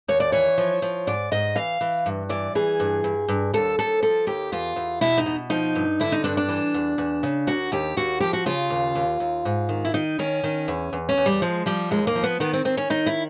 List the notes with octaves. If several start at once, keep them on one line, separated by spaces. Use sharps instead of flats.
D#2 C#5
D5
E3 C#5
F3
F3
G#2 D5
G#2 D#5
E3 F5
E3
G2
E3 D5
E3 G#4
G2
G2
G2
D#2 A4
D#2 A4
F3 A4
D#2 G4
E2 F4
E2
B2 E4
D#4
B2
F3 D#4
G2
D3 E4
D#4
G2 D4
D4
E3
E2
E2
C#3
D#2 F#4
D#2 G4
D#2 F#4
F3 G4
F#4
C#3 F4
D#2
D#2
D#2
G#2
D#3
E4
D#3 D#4
D#3 C#4
D#3
E2
E2
C#4
E2
G3
F3 G#3
F3 G3
D#2 G#3
A#3
F3
B3
D#3 B3
C4
D#3 C4
C#4
D#3 D#4
E4